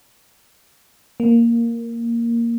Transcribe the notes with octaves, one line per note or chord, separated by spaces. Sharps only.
A#3